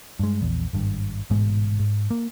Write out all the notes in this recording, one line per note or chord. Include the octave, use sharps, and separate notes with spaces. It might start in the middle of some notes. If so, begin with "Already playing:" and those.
G2 G#3
A#1 E2
G#1 G2
A1 G#2 B2 G#3
G#2
A#3